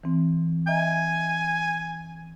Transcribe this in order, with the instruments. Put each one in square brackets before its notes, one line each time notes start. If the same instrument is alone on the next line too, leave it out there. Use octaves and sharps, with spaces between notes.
[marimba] E3 C4
[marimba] D#5 E5 A#5 [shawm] G#5